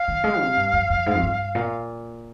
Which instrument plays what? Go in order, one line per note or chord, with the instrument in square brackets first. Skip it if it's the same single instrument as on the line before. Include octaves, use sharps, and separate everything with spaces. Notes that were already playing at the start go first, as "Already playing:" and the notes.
Already playing: [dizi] F5
[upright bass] D#3
G#3
C3
G2
F2
F2
G#2
F2
G2
A#2